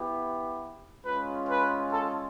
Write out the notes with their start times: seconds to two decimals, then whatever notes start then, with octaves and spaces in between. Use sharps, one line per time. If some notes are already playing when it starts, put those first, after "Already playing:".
Already playing: B3 E4 G4
1.04 G#3 C#4 F4 B4
1.48 B4
1.92 A4